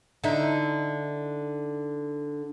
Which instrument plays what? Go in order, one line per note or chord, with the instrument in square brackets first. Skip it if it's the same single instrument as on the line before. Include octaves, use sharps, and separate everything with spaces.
[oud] D3 D#4 E4